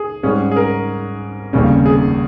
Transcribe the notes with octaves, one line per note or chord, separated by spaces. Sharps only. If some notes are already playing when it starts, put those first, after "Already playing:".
Already playing: G#4
G#2 G3 C#4 G#4
G#4
A#4
F1 D#2 C#3 G3 C#4
G#4